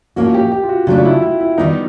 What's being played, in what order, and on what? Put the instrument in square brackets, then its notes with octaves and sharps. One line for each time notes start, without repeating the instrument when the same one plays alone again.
[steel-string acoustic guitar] A2 F3 A#3 C#4 F#4
[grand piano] G4
G4
F4
F#4
[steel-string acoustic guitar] C#3 F#3 A3 D4 [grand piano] F4
[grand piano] E4
E4
E4
[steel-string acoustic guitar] D#3 G3 B3 [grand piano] D#4